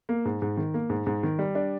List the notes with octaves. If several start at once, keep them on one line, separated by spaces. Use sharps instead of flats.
A#3
G#2
G#2
D#3
A#3
G#2
G#2
D#3
G3
D4